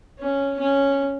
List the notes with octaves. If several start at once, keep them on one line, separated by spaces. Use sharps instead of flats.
C#4
C#4